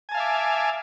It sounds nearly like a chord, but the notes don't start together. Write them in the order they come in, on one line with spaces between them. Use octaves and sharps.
G#5 A5 F5 E5 D6